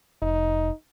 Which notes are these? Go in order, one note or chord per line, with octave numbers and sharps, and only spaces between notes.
F1 D#4